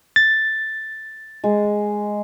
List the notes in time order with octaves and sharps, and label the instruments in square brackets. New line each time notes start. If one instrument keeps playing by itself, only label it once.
[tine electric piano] A6
[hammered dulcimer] G#3